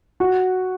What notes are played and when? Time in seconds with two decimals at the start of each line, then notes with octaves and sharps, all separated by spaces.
0.20 F#4